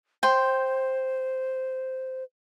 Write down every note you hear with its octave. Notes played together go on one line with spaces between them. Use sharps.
C5 G5 C6